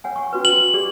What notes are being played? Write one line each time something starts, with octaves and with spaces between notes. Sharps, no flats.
C#5 F#5 G#5
C#6
C#4 F#4 B4
F#7
G4 G#4 D5